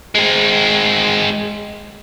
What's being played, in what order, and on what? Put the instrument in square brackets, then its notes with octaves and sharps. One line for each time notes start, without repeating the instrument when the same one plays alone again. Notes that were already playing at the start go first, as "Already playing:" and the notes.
[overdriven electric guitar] G#3 C4